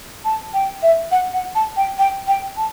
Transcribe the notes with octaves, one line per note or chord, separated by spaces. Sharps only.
A5
G5
E5
F#5
F#5
A5
G5
G5
G5
A5